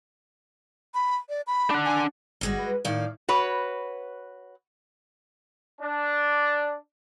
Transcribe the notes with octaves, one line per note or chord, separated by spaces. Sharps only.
B5
D5
B5
D4 F#5
G#5
G1 G3 G#3 F#4
B4
A2 D#3 D5 F5
F#4 B4 C#5
D4